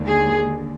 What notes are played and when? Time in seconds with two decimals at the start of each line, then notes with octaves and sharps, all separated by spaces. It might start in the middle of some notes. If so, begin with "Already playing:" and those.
Already playing: D#2 D3 G#3
0.09 G#4